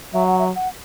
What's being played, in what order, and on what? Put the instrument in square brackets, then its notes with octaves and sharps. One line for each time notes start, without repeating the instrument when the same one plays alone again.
[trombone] F#3 [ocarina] E5
[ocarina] F#5
E5
F#5